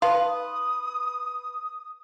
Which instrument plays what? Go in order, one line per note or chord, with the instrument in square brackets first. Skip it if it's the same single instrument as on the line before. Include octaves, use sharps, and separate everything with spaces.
[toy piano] D#4 C6 [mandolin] B4 [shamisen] F5 [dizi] D#6